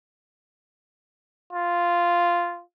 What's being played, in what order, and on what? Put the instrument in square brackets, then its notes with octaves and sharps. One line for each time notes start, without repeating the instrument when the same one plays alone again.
[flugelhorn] F4